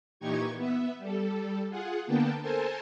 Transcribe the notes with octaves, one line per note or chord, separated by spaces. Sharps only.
A#2 E3 D#4 G4 C#6 G#6
B3 E5
G3 A4
F4 G#4 F#5
D3 A#3 B3 G5 A5
A4 A#4 C5 G#5 A5